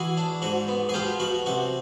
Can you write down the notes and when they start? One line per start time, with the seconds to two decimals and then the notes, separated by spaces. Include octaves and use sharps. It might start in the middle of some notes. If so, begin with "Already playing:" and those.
Already playing: E3 F#4 G#4
0.17 D4
0.42 G#2 F#4
0.68 B3
0.89 G#4
0.94 B2 F4 G4
1.20 B2 F#4
1.46 C3 F#4